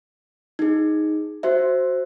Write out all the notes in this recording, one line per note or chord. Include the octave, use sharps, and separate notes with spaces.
D#4 G#4
F#4 C5 E5